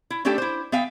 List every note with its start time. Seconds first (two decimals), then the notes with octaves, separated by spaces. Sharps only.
0.10 E4
0.25 A3 C#4 D4 G4 A4 G5
0.38 E4 C5
0.72 B3 E5 F5 G5